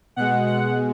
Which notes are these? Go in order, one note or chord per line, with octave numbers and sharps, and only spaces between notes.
B2 G#3 F#5
F#5